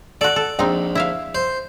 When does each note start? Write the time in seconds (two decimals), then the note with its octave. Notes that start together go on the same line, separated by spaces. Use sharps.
0.21 F#4 A4 D5
0.36 A4
0.59 A#1 C4 D#4
0.95 E4 E5 F5
1.35 C5